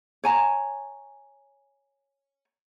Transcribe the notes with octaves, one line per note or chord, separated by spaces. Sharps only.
C#5 G#5 A#5